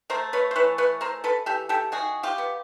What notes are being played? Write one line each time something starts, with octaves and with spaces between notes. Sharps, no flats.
A3 A#4 C5
B4 C#5
C5
E3 B4 C#5
B4 C#5
E3 A#4 C5
A4 B4
E3 G4 A4
G4 A4
D#3 F#4 G#4
F4 G4
B3